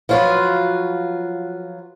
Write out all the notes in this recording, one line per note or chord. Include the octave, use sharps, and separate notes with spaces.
F3 F#3 F4 F#4 B4